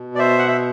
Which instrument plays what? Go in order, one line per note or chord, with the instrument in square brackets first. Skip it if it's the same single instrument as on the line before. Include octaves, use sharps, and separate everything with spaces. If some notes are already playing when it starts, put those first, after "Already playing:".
Already playing: [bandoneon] B2
D5
C5 E5
F#5
E5